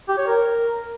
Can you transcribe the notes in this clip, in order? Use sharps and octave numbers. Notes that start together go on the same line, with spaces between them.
G4
C#5
A#4